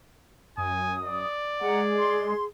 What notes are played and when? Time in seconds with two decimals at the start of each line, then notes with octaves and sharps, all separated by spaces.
0.58 F#2 G#5 D#6
1.04 D5
1.61 G#3 G#4 F#5 A#5
1.96 C6